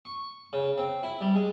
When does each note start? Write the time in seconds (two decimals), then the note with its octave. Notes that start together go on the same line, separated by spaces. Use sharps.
0.05 C#6
0.53 C#3
0.78 C4
1.03 E4
1.21 G3
1.35 G#3